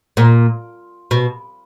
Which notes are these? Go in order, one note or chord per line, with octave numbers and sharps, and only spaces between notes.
A#2
B2